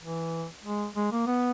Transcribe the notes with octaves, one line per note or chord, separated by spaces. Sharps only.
E3
G#3
G#3
A#3
B3